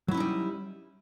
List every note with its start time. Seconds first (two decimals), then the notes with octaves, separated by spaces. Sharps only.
0.08 F#3
0.11 E4
0.14 C#4
0.17 D#4
0.20 G3